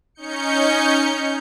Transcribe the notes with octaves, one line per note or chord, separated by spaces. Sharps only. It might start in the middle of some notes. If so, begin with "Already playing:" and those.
C#4 D#4 G6 C#7